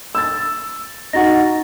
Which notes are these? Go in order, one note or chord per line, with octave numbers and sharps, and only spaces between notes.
E6 A6
D#4 F#4 F#5 A6 A#6